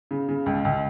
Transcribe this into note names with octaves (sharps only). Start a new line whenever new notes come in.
C#3
C#3
C#2
C#2